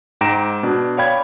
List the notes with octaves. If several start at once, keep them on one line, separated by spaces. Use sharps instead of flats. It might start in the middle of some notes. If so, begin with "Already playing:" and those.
G#2 G5 A#5 A#6 D7 E7
B2 D4
C#5 D5 F5 G5 B5 G#6